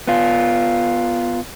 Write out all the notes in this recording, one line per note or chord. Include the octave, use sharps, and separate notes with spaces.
B3 F4